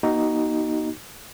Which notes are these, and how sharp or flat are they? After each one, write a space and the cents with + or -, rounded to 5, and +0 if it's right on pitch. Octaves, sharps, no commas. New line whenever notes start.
A#3 +45 D#4 +0 F#4 +35